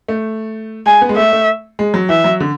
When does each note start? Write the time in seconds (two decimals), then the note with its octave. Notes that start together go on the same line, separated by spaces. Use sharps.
0.08 A3
0.86 G#3 G#5
1.01 B3
1.09 G#3
1.16 A3 E5
1.33 A3
1.79 G#3
1.94 F#3
2.09 E3 E5
2.24 F#3
2.40 D3